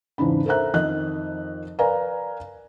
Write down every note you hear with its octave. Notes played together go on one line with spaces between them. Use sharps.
E2 G#2 C#3 D4 B5
A4 A#4 C5 E5 A#5 F#6
F2 D#3 D#5 F#6
A#4 B4 D5 F5 G#5 A#5